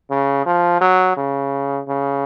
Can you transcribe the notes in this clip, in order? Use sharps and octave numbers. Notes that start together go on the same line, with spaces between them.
C#3
F3
F#3
C#3
C#3